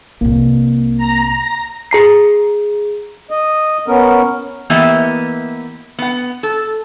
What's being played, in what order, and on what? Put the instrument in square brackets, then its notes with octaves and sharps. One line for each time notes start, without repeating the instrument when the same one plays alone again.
[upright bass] C2 C3 [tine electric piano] A#3
[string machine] A#5
[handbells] G#4 A#5 C7
[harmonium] D#5
B3 C#4 A#4
[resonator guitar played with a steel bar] E3 A#3 B3 G4 D#5 E5
B3 F#5
A4